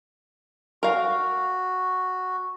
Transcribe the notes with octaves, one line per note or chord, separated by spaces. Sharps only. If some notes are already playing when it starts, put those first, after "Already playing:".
F#4 A#4 F5